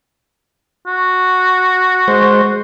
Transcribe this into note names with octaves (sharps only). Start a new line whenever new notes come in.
F#4
G#3 C5